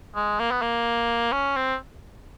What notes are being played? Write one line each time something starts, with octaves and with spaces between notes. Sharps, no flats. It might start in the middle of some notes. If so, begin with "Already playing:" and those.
G#3
A#3
B3
A#3
C#4
C4